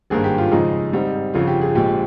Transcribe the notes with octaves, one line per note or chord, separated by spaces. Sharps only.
G#1 G2 D#3 A#3 G#4
G4
F4
F2 C#3 G#3 D#4
G#2 G3 C4 D#4
G1 F2 C#3 F4
G4
G#4
A#1 A#2 G#3 G4